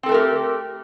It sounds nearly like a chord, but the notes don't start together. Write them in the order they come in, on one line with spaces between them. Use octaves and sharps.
C4 A4 A3 A#4 G4